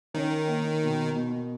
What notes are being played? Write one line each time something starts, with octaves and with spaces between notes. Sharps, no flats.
D#3 C#4
A#3
B2
B2